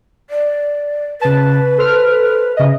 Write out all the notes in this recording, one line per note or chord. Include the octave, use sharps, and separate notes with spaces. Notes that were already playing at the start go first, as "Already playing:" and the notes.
D5
C#3 B4 A5
A4 C5 F6
C#3 D#5 E5